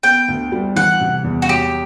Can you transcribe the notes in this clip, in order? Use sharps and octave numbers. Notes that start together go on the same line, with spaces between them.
B3 G5
D2
G3
E3 F#5
C3
E2
F#4
F#3 G4